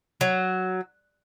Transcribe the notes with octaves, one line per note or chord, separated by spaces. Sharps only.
F#3